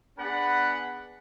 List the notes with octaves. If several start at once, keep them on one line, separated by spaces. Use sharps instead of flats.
B3 D4 G#4 B4 F#5 B5